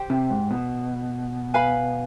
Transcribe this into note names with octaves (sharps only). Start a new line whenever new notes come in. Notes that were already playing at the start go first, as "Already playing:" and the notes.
Already playing: G4 C5 G5
C3
G#2
B2
B4 F5 G#5 B5